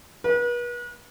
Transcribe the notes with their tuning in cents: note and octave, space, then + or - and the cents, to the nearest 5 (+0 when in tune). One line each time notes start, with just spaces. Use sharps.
B4 -40